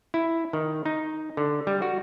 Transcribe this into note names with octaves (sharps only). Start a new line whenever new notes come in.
E4
D#3
D#4
D3
G3
F#4